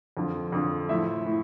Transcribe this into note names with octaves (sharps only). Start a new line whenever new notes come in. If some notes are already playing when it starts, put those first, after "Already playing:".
F2 D3 F3
F2 D3 F3
A2 F3 E5
A2